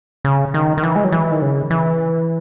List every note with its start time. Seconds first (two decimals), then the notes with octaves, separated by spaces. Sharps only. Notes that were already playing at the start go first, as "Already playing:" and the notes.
0.24 C#3
0.54 D#3
0.77 D#3
0.83 E3
0.96 G#3
1.04 F#3
1.12 E3
1.32 D#3
1.42 C#3
1.70 E3